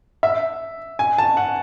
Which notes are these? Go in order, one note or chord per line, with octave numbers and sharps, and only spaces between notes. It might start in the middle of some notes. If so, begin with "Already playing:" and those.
E5
G#5
A5
F#5